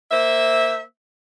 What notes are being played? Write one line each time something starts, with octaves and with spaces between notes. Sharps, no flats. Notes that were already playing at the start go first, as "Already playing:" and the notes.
A#3 C5 E5